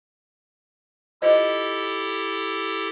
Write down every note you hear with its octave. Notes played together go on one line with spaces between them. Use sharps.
E4 F4 G4 A4 C5 D#5